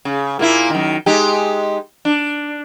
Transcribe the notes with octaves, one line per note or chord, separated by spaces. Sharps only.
C#3
A#2 A#3 E4
F#2 D#3
G#3 D#4 G4
D4